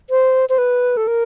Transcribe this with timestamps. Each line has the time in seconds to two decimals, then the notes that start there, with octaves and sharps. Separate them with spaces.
0.10 C5
0.49 C5
0.58 B4
0.97 A4
1.07 A#4